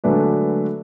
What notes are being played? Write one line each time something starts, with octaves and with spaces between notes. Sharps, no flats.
D3 F#3 G#3 A3 D4 B4